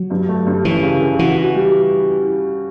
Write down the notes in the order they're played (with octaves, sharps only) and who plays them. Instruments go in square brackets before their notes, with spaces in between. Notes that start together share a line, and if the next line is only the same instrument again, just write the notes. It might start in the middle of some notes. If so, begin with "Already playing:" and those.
Already playing: [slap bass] F#3
[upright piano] G2
A3
G2
[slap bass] E3 [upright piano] C#4
[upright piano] C#3
C#3
[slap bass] E3 [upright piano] F#4
[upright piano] F#4
G3